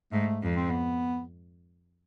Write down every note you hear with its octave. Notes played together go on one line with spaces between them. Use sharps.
G#2 A3
F2
C4
B3